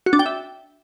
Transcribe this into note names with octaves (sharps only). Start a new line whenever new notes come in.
F#4
D4
G5
E5